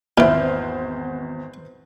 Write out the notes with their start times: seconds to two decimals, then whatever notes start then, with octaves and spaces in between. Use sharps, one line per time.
0.18 G#1 E2 A#2 E4 F4 B4 C5 F6